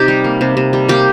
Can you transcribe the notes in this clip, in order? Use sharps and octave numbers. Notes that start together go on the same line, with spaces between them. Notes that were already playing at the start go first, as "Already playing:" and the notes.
Already playing: C3 D#4 G4
G3
A#3
C3
C3
G3
A#3 G4